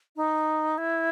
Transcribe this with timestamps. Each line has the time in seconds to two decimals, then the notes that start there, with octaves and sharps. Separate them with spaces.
0.16 D#4
0.78 E4